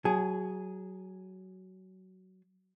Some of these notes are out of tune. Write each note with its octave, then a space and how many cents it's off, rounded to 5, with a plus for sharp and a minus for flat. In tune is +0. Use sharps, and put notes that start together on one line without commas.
F#3 +15 G#4 +0 A5 -35